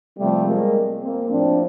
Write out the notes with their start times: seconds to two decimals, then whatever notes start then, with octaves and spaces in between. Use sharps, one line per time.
0.17 C3 F3 G3 A3
0.45 G#3 A#3
1.01 A#3 C4
1.29 A2 F3 C4 D4